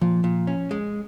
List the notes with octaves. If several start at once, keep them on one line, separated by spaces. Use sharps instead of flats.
A#2 F3
A#2
C#4
G#3